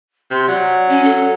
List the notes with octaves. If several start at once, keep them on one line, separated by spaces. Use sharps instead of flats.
C3 C6
F#3 D5
C#4
A4